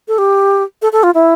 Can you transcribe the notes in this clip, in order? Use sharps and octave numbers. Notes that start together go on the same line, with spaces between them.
A4
G4
A4
A4
F4
E4